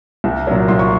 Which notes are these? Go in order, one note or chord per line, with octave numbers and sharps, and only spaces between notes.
C2
A#2 F#3
C2 C6
C#6